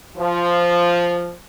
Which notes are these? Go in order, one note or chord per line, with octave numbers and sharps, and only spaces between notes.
F3